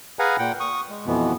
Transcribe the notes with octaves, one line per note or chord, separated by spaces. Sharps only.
G#4 B4 F5 F#5 G#5 A#5
A#2 F#5 G5
C#6 D#6
G#3
F2 B2 E3 B3